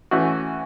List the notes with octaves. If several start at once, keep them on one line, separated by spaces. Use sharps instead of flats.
E3 A3 C#4 F#4